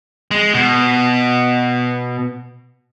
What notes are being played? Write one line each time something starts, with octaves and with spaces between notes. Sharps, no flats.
G#3
B2